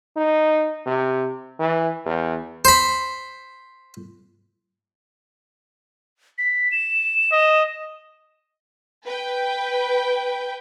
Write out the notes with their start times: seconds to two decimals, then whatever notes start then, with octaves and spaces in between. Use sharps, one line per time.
0.17 D#4
0.86 C3
1.59 E3
2.05 E2
2.65 C5 B5
6.38 B6
6.72 E7
7.32 D#5
9.05 B4 G5